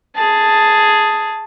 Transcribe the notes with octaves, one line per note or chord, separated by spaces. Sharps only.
G#4 A5